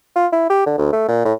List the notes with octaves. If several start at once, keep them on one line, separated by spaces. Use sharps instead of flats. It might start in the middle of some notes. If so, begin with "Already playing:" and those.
F4
E4
G4
D3
D2
A3
A#2
A2